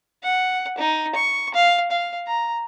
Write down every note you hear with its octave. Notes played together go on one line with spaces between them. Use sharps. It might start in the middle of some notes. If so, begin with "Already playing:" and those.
F#5
D#4
C#6
F5
F5
A#5